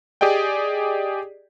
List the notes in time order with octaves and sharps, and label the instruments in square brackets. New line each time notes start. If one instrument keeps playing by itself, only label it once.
[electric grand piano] G4 G#4 D5 D#5 G5